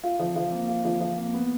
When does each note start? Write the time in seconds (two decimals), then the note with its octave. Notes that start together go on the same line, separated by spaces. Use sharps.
0.04 F4
0.19 F3
0.36 F3
0.52 A#3
0.68 F4
0.85 F3
1.01 F3
1.18 A#3
1.34 B3